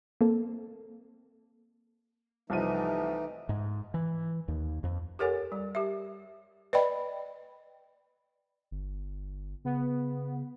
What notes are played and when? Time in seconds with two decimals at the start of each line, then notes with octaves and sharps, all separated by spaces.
0.21 A#3 C4 A4
2.50 C2 E3 F3 A3 D#4 D#7
3.49 G#2
3.94 E3
4.48 D#2
4.84 F2
5.19 G4 A4 A#4 C#5 F#5 G#5
5.52 G3
5.75 G4 E5
6.73 B4 D5 D#5 G5 B5
8.71 G1
9.64 C#3 B3